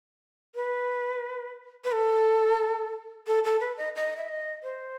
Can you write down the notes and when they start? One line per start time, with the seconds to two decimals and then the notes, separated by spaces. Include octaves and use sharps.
0.55 B4
1.84 B4
1.92 A4
3.27 A4
3.44 A4
3.60 B4
3.77 D#5
3.96 D#5
4.17 E5
4.28 D#5
4.63 C5